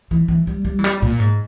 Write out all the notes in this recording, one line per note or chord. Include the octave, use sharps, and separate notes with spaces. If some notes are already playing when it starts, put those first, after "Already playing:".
E3
E3
G3
G3
E3
G3
A#2
G#2